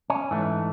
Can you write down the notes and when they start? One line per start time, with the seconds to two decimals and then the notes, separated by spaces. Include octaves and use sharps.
0.10 C#4
0.31 G#2 E3 A3